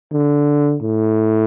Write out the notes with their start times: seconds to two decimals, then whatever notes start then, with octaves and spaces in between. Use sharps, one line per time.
0.13 D3
0.83 A2